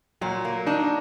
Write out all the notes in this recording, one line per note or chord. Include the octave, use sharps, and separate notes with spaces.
A#2 F#3
A#3
D4 D#4